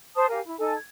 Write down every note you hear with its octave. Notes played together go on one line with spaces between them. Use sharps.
C5 A5 D#6
G4 A#4 F5 G#5
E4
D#4 A4 G#5
G#6